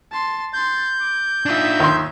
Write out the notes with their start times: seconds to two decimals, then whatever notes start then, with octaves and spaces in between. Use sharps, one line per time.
0.12 A5 C6
0.53 C6 G6 A6
1.00 D6
1.46 D4 D#4 F4 E5
1.80 D#2 C6